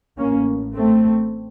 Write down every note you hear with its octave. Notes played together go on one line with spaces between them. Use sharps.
A1 A2 A#3 C#4
A3 C4